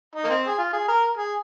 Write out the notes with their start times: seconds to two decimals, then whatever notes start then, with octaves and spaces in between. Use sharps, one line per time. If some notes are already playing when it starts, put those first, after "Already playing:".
0.15 D#4
0.24 A#3
0.30 C4
0.47 G#4
0.58 F4
0.73 G#4
0.88 A#4
1.17 G#4